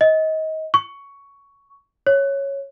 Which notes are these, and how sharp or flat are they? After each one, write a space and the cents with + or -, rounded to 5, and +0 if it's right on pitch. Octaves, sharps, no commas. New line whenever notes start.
D#5 +25
C#6 +10
C#5 -5